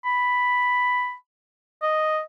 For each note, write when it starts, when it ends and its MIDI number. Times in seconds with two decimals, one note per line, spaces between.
0.05 1.14 83
1.82 2.20 75